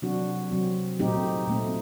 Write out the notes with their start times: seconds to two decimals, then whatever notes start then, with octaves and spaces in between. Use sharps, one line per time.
0.02 C3 F#3 C4 D4 F#4
0.52 C3 F#3 C4
0.99 A#2 A3 C4 D#4 G4
1.47 A#2 A3 C4